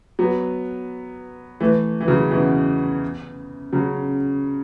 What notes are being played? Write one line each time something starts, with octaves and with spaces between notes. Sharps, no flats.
F#3 B3
E3 A3
E3
C#3 F#3
B2 E3
C#3 F#3